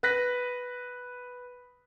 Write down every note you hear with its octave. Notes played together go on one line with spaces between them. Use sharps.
B4 F#6 A#6 B6